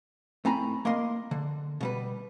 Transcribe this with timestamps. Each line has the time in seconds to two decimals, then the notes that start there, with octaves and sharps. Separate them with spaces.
0.45 A2 C4 G#5 A#5 B5
0.85 A#3 A#4 D#5 C6
1.31 D3
1.81 B2 G3 B4